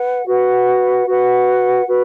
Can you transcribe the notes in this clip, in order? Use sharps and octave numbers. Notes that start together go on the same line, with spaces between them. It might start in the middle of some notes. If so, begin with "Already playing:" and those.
Already playing: B4 F#5
F#4 B4 F#5
F#4 B4 F#5
F#4 B4